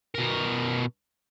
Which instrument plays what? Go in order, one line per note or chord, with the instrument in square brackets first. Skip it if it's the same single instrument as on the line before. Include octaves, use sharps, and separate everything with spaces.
[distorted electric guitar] B2 A#4